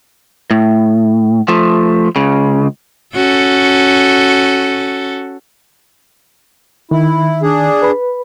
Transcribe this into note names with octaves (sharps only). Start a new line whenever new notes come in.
A2
F3 A3
C#2 C#3
C#4 F#4 A4
D#3 E4
D4 G#4
B4 B5